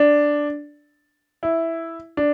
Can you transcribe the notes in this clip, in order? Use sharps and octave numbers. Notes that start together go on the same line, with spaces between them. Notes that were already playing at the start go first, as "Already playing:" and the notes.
Already playing: D4
E4
D4